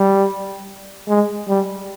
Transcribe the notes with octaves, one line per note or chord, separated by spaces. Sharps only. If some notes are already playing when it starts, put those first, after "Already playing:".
Already playing: G3
G#3
G3